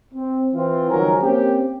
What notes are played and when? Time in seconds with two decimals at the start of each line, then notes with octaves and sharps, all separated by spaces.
0.13 C4
0.54 E3 C4 F4
0.90 C#2 D#3 F3 F#3 A#4 G#5
1.21 A#3 C4 C#4 G4